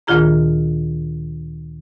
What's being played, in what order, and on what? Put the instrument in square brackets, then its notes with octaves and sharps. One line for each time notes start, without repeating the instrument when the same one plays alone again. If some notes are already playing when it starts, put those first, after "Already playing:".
[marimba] D2 A#2 D#3 F4 G#4 A#5